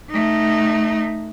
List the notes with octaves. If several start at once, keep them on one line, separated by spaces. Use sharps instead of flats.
A3 D#4